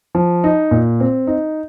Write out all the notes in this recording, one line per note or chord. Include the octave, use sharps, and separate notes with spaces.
F3
D#4
A#2
C4
D#4